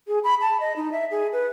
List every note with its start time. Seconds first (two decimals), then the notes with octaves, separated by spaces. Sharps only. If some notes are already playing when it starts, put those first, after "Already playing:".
0.08 G#4
0.24 B5
0.41 A5
0.60 D#5
0.76 D#4
0.92 E5
1.11 G#4
1.33 B4